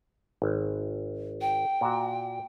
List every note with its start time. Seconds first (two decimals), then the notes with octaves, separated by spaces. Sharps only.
0.42 G#1
1.41 G5
1.81 A#2 F#4